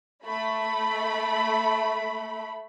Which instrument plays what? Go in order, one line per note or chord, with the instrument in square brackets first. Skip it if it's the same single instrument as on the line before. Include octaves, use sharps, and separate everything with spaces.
[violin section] A3 B5